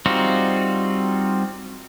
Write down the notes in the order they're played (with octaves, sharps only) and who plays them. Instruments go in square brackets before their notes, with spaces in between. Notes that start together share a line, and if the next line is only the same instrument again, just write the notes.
[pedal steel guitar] G3 C4 D#4 F4 F#4